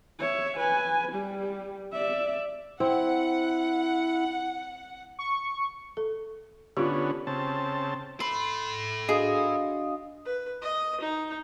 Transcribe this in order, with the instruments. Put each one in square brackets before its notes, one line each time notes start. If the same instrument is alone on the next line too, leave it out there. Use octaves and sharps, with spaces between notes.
[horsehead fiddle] C#5 E5
B4 G#5
G3 G4
D5 E5
[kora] C4 [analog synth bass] E4 [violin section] F#5
[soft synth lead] C#6
[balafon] A4
[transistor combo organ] D3 B3 C#4 [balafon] F4 G4
[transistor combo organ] C#3 C4 A5
[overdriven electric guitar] A4 B5 [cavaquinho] C6
[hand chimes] D4 F#4 D#5 [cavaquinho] G#4 [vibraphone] F5 D#6
[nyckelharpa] B4
D#5 D#6
D#4